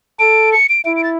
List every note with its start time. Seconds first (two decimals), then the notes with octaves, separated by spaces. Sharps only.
0.19 A4 D7
0.52 C#7
0.69 D7
0.85 E4 D7
0.96 D7
1.04 A6